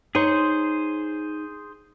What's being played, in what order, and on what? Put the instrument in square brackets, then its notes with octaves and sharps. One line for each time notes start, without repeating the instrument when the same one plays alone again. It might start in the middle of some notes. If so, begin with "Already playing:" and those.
[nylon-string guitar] D#4 C#5 [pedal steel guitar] G#4 C5